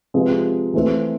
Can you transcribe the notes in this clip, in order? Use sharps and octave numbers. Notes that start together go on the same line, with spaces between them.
C3 F3 G#3 B3
E3 A3 C4